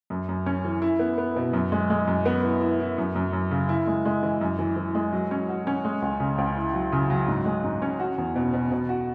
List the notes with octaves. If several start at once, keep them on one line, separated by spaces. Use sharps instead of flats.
F#2
F#2
C#4
E3
E4
B3
B3
B2
F#2
G#3
G#3
F#2
B3
E4
E4
E4
F#2
F#2
F#2
C#3
E4
G#3
G#3
E3
F#2
E3
E3
G#3
F#3
C#4
F#4
C#4
G#3
C#2
C#3
C#2
E4
F#3
C#3
F#3
G#2
G#3
G#2
C#4
F#4
E2
B2
B2
B2
F#4